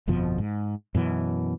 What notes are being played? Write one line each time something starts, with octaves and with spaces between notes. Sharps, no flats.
G1 F2 B2 F3
G#2
F#2 B2 E3